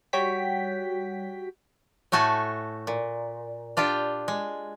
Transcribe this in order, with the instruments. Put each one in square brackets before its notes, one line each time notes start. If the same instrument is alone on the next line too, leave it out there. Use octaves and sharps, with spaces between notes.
[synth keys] G3 F#4 C#5 G5 B6
[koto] A2 A3 F#4 A4 G#5
A#2
D4 F4 G4 G5
G#3